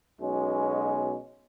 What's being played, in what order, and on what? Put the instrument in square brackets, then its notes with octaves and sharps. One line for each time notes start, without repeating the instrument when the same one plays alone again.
[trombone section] B1 B2 G#3 C#4